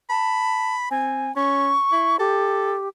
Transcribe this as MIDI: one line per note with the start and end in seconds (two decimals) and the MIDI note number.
0.10 0.76 81
0.10 0.87 83
0.91 1.31 60
0.91 1.34 80
1.36 1.74 61
1.36 2.19 85
1.92 2.14 64
2.20 2.89 67
2.20 2.75 69